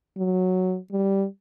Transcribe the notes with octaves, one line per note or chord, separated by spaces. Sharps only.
F#3
G3